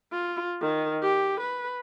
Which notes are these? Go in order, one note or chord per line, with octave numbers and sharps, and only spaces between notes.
F4
D#3
G4
B4